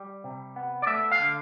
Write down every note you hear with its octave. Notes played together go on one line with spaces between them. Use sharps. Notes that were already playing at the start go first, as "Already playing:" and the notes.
Already playing: G3
C3
B3
D5
A3 E5
F5
D3